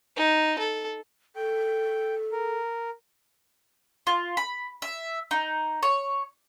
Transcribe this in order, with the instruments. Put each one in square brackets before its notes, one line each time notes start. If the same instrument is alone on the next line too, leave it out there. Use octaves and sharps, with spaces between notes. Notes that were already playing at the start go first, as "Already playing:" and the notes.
[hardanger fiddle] D#4
A4
[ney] A4 [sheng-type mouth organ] G5
[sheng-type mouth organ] A#4
[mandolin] F4
B5
E5
D#4
C#5